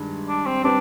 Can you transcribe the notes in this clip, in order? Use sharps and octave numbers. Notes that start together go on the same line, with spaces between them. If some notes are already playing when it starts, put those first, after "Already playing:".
Already playing: G2 D#3 G#3
D4
C4
G3 C4 D4 B4